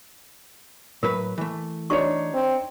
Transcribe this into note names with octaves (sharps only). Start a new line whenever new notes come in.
A2 F#3 A#4 B4
E3 A3
D4 D#4 F#4 C#5 C#6
C4